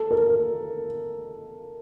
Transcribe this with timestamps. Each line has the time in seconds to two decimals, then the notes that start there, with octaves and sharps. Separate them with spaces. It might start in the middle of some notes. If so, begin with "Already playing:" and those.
Already playing: A4
0.11 A#4